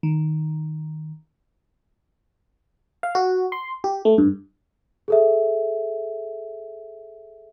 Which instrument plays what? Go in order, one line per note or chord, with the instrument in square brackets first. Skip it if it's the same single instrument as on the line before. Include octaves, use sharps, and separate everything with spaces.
[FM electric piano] D#3
F5
F#4
C6
G4
A3
G2
[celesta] G#4 A4 E5